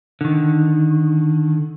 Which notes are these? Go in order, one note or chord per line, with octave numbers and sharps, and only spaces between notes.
D3 D#3